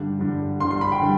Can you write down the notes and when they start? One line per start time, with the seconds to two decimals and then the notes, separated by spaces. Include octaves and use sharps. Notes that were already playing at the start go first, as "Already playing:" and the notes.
Already playing: G2 D3 G3
0.19 G2 D3 G3
0.60 G2 D3 G3 C6
0.71 C6
0.81 B5
0.92 G5
1.01 D3 G3